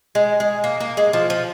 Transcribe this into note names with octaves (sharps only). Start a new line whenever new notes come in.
G#3
G#3
A#3
A#3
G#3
F3
F3